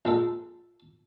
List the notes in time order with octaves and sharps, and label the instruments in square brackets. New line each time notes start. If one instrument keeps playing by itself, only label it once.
[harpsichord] A#1 G#3 A4